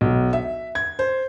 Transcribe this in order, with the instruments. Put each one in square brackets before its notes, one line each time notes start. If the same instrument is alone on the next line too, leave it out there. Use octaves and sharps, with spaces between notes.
[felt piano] B1
E5
G#6
C5